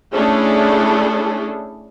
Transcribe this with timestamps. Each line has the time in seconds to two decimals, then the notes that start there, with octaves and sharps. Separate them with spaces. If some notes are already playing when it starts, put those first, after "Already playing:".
0.12 A3 C#4 D4 E4 G#4 A4